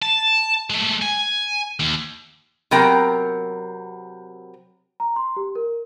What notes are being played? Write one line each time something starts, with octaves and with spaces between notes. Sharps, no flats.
A5
G#3 A3
G#5
D#2
C3 F#3 B3 A#4 G5
A#5
C6
G4
A#4